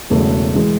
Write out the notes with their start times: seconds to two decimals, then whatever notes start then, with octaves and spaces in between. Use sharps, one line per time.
0.10 E1 E2 C#3 F#3 A3
0.55 E3 G#3